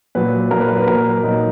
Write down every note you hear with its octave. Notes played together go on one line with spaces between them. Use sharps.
A#2 F#3 B4
A#2 F#3 A#4
B4
A#4
B4
A#2 F#3 A#4
A#2 F#3 D#4